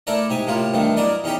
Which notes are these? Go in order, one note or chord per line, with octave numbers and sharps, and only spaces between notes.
A3 E4 A4 A#4 D5
G#2 G4 G#5
A2 C3 A#3 F4
G2 D#3 E3 A3
F#3 E4 A#4 D5 D#5
E2 C#4 D#4 G4 G5